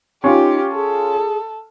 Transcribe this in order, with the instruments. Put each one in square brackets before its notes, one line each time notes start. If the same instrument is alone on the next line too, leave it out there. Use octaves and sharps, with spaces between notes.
[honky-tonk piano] C#4 F4 [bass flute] D#4 [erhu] G4
[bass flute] G#4 [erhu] A4